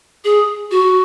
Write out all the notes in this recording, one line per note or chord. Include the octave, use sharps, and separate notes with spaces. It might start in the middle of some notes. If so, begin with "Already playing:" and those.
G#4
F#4